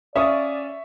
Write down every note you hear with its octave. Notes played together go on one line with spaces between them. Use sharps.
C#4 D5 E5 F5 C#6 D#6